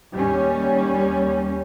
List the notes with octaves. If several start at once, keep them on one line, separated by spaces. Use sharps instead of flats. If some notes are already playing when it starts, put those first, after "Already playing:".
D#2 G3 C#4